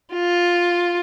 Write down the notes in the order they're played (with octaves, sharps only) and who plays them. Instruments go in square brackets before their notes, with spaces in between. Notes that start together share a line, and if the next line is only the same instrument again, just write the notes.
[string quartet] F4